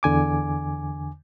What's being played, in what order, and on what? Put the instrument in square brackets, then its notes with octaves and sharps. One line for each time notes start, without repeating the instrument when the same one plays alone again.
[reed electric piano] E2 D3 G#5 D6